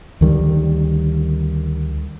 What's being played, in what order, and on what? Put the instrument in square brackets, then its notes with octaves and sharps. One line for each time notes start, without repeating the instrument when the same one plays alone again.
[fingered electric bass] D2 D#3 G3